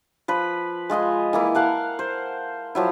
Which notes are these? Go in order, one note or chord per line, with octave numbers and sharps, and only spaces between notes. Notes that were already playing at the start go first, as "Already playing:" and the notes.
F3 B4 B5
G#3 F4 D#5 G#5
E3 A#3 E4
A#4 F5 F#5 A5
C5
F3 F#3 E4